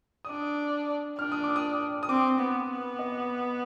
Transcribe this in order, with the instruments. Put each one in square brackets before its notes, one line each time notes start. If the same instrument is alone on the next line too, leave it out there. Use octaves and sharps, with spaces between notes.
[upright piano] D#6
[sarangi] D4 [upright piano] D6
[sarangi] D4 [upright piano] F6
[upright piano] D#6
D6
D#6
D#6
[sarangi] C4 [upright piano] D6
[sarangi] B3
B3
[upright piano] D#5